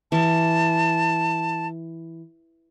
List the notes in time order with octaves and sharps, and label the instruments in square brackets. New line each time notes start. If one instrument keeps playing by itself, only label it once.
[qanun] E3 [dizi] A5